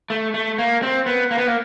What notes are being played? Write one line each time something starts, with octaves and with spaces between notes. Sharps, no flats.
A3
A3
A#3
C4
B3
A#3
B3
A#3